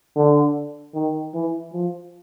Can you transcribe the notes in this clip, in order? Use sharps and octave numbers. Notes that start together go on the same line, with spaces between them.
D3
D#3
E3
F3